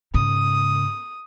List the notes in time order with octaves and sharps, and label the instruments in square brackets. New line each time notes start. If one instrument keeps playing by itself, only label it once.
[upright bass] G#2 C#3 [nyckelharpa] D#6